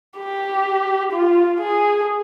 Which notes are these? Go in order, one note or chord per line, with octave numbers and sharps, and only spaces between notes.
G4
F4
G#4